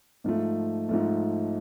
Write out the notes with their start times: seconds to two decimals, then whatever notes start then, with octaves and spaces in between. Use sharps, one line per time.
0.24 G#2 F3 A3
0.89 G#2 F3 A3